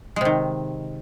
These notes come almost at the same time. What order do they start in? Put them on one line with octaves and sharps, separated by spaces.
G#3 C3 D#3